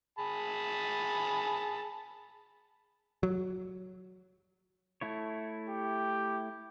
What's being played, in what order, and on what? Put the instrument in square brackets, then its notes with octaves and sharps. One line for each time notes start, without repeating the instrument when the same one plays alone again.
[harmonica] G#4 A5 B5
[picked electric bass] F#3
[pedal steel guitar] A3 E4 C#5
[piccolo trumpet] G4